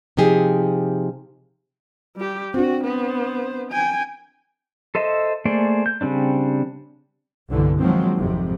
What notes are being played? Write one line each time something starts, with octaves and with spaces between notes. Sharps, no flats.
C3 F3 D#4 G4 G#4
G3 G4
C4 D4 F#4
B3 C5
G5 G#5
A4 C5 D#5 E5
A3 A#3 G#4 C5 D5
G6
C#3 G3 C4 D4
C2 G2 B2 D3 E3
D#3 F3 F#3 G#3 A#3 C4
G#1 F2 G#2 C3